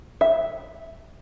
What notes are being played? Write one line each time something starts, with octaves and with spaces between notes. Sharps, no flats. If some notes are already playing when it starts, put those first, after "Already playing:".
E5